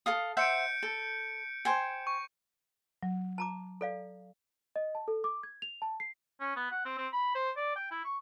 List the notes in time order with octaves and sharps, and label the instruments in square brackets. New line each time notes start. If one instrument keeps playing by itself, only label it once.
[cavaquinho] A4 F5 D#6
[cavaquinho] C5 E5 F#5 [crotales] G6 C#7 D7
[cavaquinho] A4
C5 G5 G#5
[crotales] C#6
[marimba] F#3
[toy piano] A5 A#5 D6
A4 D5 F5
[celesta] D#5
A5
A4
D6
G#6
F7
A5
C7
[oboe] C#4
B3
F#5
C4
C4
B5
C5
D5
G5
E4
C#6